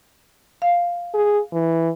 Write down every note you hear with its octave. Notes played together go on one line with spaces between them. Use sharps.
F5
G#4
E3